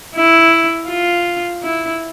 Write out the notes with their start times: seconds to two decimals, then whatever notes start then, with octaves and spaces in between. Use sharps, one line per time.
0.15 E4
0.88 F4
1.63 E4